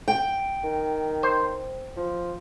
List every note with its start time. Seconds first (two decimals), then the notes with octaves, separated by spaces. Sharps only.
0.08 G5
0.64 D#3
1.23 C5
1.97 F3